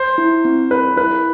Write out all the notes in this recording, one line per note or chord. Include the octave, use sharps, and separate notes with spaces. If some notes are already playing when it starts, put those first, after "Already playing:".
Already playing: C5
E4
C4
A#4 B4
E4 B4